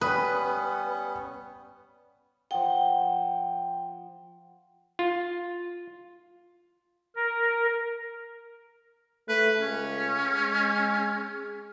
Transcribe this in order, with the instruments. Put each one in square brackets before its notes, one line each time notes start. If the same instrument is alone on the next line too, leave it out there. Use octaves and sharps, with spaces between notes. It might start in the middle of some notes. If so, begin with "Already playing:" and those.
[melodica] G3 B3 C#4 [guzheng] B4 [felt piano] B5 D#6
[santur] F3 F#5 [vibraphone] G5
[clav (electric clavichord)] F4
[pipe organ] A#4
[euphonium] A3 [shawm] B4
[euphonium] C#2 [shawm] C#4
[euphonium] G#3